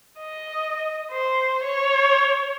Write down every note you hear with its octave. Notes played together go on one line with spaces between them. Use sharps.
D#5
C5
C#5